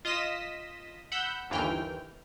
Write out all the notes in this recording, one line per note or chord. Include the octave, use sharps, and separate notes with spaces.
F4 D#5 D#6 B6 E7
F#5 B5 E6 G6
G1 D#2 E3 G5 F6